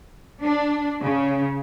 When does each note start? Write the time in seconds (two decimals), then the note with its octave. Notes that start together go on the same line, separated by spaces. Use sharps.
0.43 D4
1.02 C#3